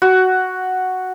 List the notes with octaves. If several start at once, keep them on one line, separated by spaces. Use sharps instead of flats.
F#4